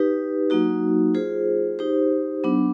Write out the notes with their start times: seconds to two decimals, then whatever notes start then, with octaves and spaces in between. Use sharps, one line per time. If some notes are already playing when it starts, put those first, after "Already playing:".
Already playing: D#4 G4 B4
0.50 F#3 A#3 D#4 F#4
1.14 F4 G#4 C5
1.79 D#4 G4 C5
2.44 F#3 B3 D4